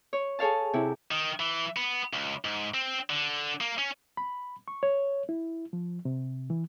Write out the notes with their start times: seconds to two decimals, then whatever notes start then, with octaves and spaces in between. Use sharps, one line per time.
0.13 C#5
0.39 G#4 A4 C#5 F5 A5
0.73 C3 E4
1.11 D#3
1.40 E3
1.77 B3
2.13 C#2
2.45 G#2
2.74 C4
3.10 D3
3.61 A#3
3.78 C#4
4.17 B5
4.68 C#6
4.83 C#5
5.29 E4
5.73 F3
6.05 C3
6.50 E3